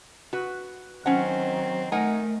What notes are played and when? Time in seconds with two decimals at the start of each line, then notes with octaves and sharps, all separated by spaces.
0.33 F#4 B4
1.06 D#3 F#3 C4 C#4 F#5
1.92 A3 D#4 A#4 F#5 G#5